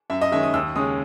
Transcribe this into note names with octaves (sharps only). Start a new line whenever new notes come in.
F#2 E5
D#5
D#3 G#3 C#4 E5
D#6
D#2 E6
C#3 G#3 C#4 D#6